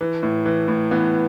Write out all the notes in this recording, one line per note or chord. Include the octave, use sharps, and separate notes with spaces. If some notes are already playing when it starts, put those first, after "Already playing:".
E3
A2
E3
A2
E3 B3